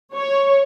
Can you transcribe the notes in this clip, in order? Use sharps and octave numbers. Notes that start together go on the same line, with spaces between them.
C#5